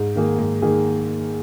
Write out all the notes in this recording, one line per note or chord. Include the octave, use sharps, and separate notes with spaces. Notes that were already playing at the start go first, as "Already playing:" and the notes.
Already playing: G#2
D#3 A#3 G#4
G#2
D#3 A#3 G#4